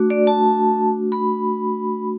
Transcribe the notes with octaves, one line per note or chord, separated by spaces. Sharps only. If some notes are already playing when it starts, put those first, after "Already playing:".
Already playing: A3 D4 F#4
D5
A5
B5